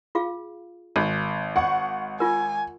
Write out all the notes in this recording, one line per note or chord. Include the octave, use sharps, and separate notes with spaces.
F4 G#4 F5
G#1
F#5 C#6
F4 A#4 G#5